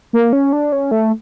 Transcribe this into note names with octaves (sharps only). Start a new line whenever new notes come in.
A#3
C#4
D4
C#4
A3